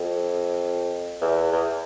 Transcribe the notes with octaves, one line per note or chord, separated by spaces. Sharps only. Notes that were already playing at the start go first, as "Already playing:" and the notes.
Already playing: F2
E2
E2